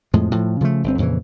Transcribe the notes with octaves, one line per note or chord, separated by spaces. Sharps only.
F2 A2 F3 G#3
A2 F3
C#3 F3 G3 A3
G1 C4
F2 A#2 C#3 E3